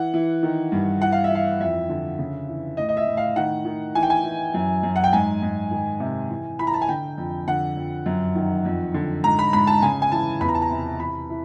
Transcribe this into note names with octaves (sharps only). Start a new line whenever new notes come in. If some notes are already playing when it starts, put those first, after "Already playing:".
Already playing: E3 F#5
E3
D#3
G2
E3 F#5
F5
E5
E3 F5
F2 E5
D3
C#3
E3
A2 D#5
D#5
E5
A2
F5
D#3 F#5
D#3
E3 G#5
G5
G#5
E3
F#2
F#2
F#5
G5
G#2 G#5
G#2
D#3
C3
E3
E3 B5
A#5
A5
G#5
D3 G5
F2
D3 F#5
F2
F#2
D#3
F2
D3
G#2 A#5
B5
G#2 B5
A5
C#3 G#5
G#5
E3 A5
E2 B5
A#5
A5
A#5
C3
E3 B5
E3